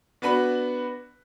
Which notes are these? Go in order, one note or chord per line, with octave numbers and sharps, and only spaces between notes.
B3 D4 F#4 B4 B5